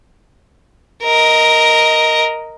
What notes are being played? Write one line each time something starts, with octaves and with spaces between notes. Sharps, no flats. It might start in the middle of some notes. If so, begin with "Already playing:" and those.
A#4 D#5